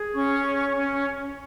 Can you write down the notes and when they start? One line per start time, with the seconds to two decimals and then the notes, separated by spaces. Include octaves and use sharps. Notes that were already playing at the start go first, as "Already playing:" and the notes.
Already playing: G#4
0.14 C#4 C#6
0.46 C#5
0.76 C#4